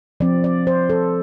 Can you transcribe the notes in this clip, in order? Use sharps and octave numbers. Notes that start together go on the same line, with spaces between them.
F3 C4 D5
D5
C5
A4